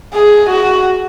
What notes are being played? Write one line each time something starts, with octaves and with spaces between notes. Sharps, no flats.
G#4
F#4